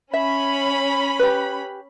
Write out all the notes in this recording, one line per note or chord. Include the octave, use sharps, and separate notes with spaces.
C#4 E5 B5
G4 B4